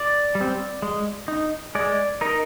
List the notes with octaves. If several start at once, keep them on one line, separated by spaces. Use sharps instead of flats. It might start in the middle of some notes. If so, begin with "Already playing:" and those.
Already playing: D5
G3
C4
G#3
D#4
G#3 D5
D#4 A#4